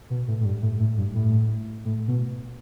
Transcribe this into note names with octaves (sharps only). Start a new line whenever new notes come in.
B2
A2
A2
G2
A2
A2
G2
A2
A2
B2